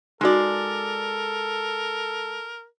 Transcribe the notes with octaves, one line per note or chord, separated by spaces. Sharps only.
G#3 D#4 F#4 A4 A#4 D5